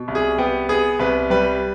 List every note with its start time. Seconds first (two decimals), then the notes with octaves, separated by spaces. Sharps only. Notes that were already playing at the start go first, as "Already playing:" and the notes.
Already playing: B2
0.08 C2
0.15 G#4
0.38 B3 G4
0.69 B3 G#4
0.99 C2 B4
1.30 G3 B4